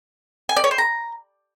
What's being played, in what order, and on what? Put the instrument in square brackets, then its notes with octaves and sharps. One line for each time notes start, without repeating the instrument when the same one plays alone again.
[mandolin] G#5
D5
C#5
C5
A#5